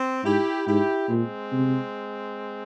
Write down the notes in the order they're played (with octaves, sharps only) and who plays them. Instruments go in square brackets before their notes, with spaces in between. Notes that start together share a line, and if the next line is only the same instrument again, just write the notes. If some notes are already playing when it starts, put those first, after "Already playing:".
Already playing: [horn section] C4
[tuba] G#2 [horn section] E4 G4
[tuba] G#2 [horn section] E4 G4
[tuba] A#2 [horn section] G#3 C4
[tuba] C3